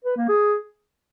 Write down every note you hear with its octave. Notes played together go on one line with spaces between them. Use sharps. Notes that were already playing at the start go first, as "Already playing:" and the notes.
B4
A#3
G#4